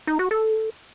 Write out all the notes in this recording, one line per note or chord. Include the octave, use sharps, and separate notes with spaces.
D#4
F#4
A4